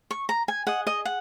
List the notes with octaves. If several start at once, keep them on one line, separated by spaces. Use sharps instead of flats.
C#6
A#5
G#5
G#4 D#5 F#5
D#5
F#5